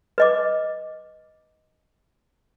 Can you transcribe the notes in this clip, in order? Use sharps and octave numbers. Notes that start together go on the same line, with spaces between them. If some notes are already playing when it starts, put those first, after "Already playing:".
B4 D#5 D6